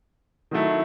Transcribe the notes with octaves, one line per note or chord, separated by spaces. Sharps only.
D#3 F#3 A3 E4